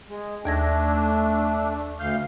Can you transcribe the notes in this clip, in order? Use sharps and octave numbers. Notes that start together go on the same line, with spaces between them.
G#3
D#2 A3 D4 G#6 A#6
D2 F5 G6